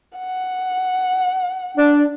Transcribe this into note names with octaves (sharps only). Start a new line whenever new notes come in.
F#5
D4